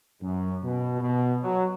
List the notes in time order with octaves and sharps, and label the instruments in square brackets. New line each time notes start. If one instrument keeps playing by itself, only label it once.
[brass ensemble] F#2
B2
B2
F#3